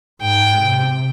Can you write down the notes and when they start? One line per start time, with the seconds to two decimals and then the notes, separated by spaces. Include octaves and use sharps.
0.21 G#2 G5
0.58 C3